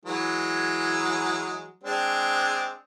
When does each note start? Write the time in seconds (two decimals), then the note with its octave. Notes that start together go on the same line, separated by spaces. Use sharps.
0.05 E3 F#3 G#3
1.84 G#3 C4 D4